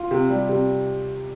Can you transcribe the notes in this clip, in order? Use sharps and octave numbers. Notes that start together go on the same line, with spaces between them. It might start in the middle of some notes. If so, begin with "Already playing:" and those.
Already playing: F4
C3
G3
C3